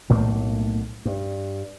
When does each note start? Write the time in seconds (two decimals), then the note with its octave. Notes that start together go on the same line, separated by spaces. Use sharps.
0.09 B1 A2 A3 A#3
1.05 G2